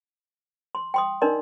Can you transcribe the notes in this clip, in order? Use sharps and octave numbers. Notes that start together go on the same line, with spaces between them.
C6
G5 C6 D#6
D4 D#4 A#4 D5 D#5 C6